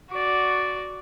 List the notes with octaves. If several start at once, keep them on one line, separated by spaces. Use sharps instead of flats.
F#4 D5